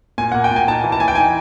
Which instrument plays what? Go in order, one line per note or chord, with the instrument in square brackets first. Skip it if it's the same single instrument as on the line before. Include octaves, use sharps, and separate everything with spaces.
[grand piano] A#2 G#5
A#3 F#5
G5
A#2 G#5
D#4 A5
E3
A5
E3 G#5
G5
D#4 G#5